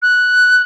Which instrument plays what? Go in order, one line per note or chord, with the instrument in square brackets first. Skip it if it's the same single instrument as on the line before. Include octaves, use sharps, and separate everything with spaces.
[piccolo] F#6